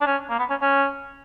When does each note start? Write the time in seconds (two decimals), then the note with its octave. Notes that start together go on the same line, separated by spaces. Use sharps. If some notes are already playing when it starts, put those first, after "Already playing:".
0.01 D4
0.06 C#4
0.30 A#3
0.39 B3
0.50 C#4
0.62 C#4